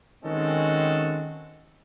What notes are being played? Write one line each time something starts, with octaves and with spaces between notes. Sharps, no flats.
D#3 G#3 C4 C#4 F#4 A4